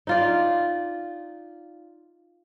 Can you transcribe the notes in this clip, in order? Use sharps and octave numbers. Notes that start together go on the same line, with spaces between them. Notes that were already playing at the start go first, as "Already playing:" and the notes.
D#4 F4 D5